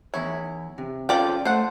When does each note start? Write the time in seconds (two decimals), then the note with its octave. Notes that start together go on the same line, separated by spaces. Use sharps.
0.14 E2 E4 C#5
0.78 C3
1.09 F3 C#4 F4 A4 D5 G5
1.45 A3 A4 C5 F#5